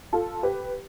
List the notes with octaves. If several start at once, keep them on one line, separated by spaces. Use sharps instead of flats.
F4 A4
G4 B4